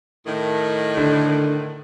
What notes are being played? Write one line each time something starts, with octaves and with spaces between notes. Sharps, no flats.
A2 D#3
D3